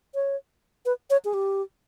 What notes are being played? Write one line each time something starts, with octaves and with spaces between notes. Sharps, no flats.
C#5
B4
C#5
G#4
G4